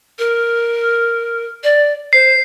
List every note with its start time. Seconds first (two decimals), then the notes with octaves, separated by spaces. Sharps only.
0.19 A#4
1.63 D5
2.13 C5 C7